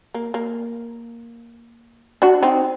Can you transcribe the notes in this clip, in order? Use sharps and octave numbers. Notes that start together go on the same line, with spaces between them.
A#3
A#3
D4 F#4
C4 D#4